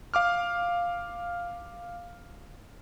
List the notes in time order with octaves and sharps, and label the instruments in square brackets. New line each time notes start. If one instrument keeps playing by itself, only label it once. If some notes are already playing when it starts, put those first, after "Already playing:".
[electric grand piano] F5 D6 F6